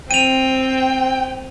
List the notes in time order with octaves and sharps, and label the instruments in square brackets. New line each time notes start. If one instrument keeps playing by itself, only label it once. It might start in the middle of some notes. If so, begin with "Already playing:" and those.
[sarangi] C4 [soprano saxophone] G5 [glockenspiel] D#7 F7